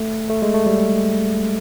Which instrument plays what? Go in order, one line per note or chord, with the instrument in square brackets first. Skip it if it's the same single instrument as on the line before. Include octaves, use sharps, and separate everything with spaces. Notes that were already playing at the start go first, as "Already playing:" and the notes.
Already playing: [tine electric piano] A3
A3
G#3
A3
G3